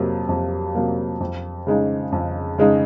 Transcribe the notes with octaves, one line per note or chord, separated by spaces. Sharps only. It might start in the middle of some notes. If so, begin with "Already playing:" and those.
Already playing: F2 C3 F#3 A#3
F2
C3 F#3 A#3
F2
C#3 G#3 D#4
F2
C#3 G#3 D#4